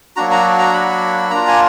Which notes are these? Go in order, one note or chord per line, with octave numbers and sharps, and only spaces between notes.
F#3 A#3 D4 F#4 A#5
A#5
A#5
B5
A#3 D4 F4 A#5
G#5